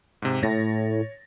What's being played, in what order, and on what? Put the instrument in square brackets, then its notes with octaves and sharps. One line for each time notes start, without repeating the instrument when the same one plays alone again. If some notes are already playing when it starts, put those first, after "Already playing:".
[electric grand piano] G#2 C3
[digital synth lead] A2 [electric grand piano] C#5 A6 A#6